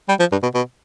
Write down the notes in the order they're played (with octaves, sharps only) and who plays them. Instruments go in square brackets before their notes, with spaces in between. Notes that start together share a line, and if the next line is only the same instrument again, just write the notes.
[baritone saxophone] G3
F3
G2
B2
B2